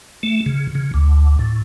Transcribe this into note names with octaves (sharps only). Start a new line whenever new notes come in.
A3
C#3
C#3
D2
A2